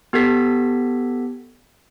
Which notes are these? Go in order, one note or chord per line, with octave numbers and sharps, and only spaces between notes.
B3 G4 A4 G#6 B6